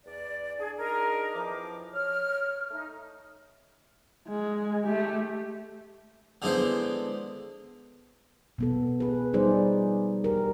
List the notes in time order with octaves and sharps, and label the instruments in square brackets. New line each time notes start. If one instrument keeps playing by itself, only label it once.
[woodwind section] E2 D5
D4 G#4
D4 D#4 G#4 A#4
F2 E3 F3 D6
C#5 F6
A3 D#4
[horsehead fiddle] G#3
A3 G4
[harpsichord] D3 G#3 B3 E4 C5
[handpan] B2 B3 A4
G#4 B4
F3 G3 D#4 G#4 C5 D5
G4 A#4